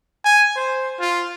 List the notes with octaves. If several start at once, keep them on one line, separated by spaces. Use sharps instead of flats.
G#5
C5
F4